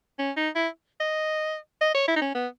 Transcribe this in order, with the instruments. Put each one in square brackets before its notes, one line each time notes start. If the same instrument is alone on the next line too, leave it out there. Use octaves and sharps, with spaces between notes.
[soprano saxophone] C#4
D#4
E4
D#5
D#5
C#5
E4
D#4
C#4
B3